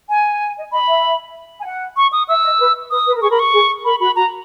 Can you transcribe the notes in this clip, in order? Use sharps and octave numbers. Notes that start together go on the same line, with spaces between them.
G#5
D#5
D#5 B5
E5
G#5
F#5
C#6
D#6
E5 E6
D#5
B4
B4 D#6
B4
A#4
G#4 C#6
A#4 B5
C#6
G#4
A#4 B5
F#4 B5
F#4 A#5